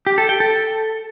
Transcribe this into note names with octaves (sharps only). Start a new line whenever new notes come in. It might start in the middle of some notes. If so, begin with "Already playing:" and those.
G4
A4
G5
A4